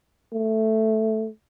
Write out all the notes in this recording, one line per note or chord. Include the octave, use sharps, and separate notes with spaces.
A3